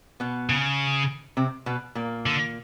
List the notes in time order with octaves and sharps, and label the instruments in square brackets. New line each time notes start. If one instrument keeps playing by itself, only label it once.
[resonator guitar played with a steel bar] B2 B3
[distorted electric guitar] C#3
[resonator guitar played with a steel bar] C3 C4
B2 B3
A#2 A#3
[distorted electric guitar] D3